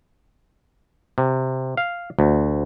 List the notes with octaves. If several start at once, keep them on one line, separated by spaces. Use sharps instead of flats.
C3
F5
D2